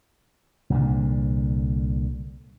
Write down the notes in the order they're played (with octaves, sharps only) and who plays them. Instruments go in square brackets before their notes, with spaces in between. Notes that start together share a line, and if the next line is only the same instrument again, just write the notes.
[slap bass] C2 A#2 D3